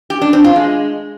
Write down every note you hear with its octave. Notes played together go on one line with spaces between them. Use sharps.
G4
D4
C4
F4
G#3